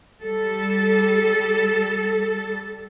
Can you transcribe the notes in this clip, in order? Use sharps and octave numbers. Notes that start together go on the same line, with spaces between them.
G3 A4